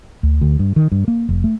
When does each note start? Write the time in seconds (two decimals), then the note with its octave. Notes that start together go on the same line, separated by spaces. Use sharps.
0.23 D2
0.41 D2
0.59 G2
0.76 D#3
0.92 G2
1.08 A#3
1.29 F1
1.44 A3